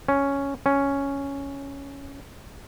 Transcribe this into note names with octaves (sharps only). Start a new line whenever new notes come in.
C#4
C#4